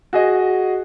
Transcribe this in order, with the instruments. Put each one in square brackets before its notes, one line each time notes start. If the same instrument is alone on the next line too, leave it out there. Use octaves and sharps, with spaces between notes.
[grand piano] F#4 G#4 D#5